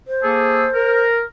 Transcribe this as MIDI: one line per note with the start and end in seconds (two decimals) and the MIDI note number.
0.08 1.02 72
0.23 0.65 58
0.23 0.65 68
0.23 0.65 69
0.74 1.22 70